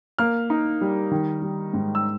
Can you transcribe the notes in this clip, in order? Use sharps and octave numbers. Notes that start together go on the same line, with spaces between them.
A#3 F6
D#4
G3
D#3
G3
G#2
E6